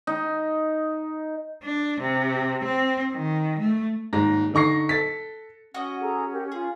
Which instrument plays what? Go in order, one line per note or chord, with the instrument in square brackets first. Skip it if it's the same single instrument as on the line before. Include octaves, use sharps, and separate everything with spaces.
[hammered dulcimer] D#4
[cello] D4
C3
C4
D#3
A3
[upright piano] D#1 G#2 A#6
D3 D#4 C#6 A#6 C7
A4 A6 B6
[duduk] C#4 [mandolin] F#4 D#5 [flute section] F#5
[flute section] G#4 A4 A#5
G4 A#4
[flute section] F4 [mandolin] G#4